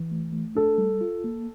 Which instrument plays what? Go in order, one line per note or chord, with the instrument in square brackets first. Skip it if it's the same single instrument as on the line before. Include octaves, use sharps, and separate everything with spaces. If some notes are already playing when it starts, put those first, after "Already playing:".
Already playing: [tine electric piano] E3
A3
A3
[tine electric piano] D4 [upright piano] A4
[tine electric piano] G3
F4
A#3